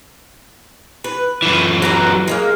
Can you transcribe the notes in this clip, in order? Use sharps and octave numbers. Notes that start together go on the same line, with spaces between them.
B4
F#2 E3
F#4 B4 A#5
G#3 A#3 F5